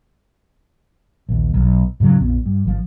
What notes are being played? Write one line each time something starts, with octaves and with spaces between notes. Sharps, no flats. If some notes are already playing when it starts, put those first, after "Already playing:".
A#1 D#2
B1
F2 G#2 C#3 F#3
A#1 F2 B3
G2
G#1 F3